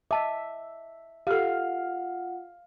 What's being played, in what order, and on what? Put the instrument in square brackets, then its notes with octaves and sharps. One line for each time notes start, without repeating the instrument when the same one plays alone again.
[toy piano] D#5 A5 D6 [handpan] E5
[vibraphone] F4 F#5 [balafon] G4 A4 [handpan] F5